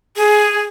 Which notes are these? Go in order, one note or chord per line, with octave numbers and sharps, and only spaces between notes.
G#4